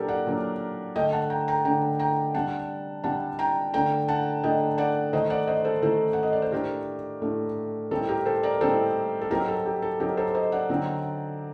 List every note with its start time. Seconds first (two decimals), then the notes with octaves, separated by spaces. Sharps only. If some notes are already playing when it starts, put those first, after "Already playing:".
Already playing: A#2 F#3 A#3 D4 G4 A4 A#4
0.08 D5 F#5
0.26 A#2 F#3 A#3 D4
0.96 D3 A3 D4 D#5 G5
1.13 F#5 A5
1.30 G5 A#5
1.48 G5 A#5
1.65 D3 A3 D4 G5 A#5
1.99 G5 A#5
2.34 C3 G3 D4 F#5 A5
3.04 C3 G3 D4 F#5 A5
3.39 G5 A#5
3.74 D3 A3 D4 G5 A#5
4.08 F#5 A5
4.43 D3 A3 D4 D#5 G5
4.78 D5 F#5
5.13 D#3 A3 D#4 C5 D#5
5.30 D5 F#5
5.47 C5 D#5
5.65 A4 C5
5.82 D#3 A3 D#4 A4 C5
6.13 F#5
6.23 D#5
6.33 D5
6.42 C5
6.52 A2 A3 D4 G4 A#4
7.22 A2 A3 D4
7.91 A2 G3 C4 D#4 A4
8.09 G4 A#4
8.25 A4 C5
8.43 A#4 D5
8.61 A2 G3 C4 D#4 A4 C5
9.21 A4
9.30 F#3 C4 D#4 G4 A#4
9.48 A4
9.66 G4
9.82 A4
10.00 F#3 C4 D#4 G4 A#4
10.17 A4 C5
10.35 C5 D#5
10.52 D5 F#5
10.70 D3 F#3 C4 D#4